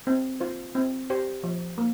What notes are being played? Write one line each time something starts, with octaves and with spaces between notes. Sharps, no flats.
C4
F4 C5
C4
G4 C5
F3
A#3